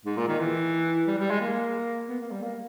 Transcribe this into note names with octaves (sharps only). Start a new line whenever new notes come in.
G#2
A#2
D#3
E3
G3
G3
G#3
A#3
B3
A#3
G3
A#3